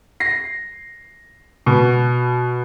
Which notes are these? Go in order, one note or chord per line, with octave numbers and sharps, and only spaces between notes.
A#6 C7
B2